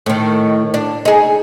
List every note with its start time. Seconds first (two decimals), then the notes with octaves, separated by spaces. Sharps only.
0.06 A2 D#3
0.74 D4
1.05 D#4 G#4